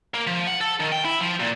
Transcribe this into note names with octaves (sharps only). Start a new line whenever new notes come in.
A#3
F3
F#5
A4
D#3
G5
E4
F3
A#2